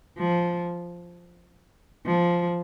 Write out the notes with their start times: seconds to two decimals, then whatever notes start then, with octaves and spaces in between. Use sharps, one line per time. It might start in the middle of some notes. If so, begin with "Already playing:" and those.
0.18 F3
2.07 F3